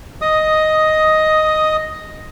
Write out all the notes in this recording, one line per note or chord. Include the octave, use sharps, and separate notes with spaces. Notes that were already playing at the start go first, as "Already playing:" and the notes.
D#5 D#6